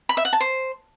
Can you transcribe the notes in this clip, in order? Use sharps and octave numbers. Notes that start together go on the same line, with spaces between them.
B5
E5
F#5
A5
C5